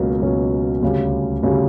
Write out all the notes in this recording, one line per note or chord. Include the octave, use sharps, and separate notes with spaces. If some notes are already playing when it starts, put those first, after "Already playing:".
Already playing: C#2 B2 F#3 A#3 C#4
C#2 B2 F#3 A#3 C#4
D2 C#3 G3 C#4 G4
D2 C#3 G3 C#4 G4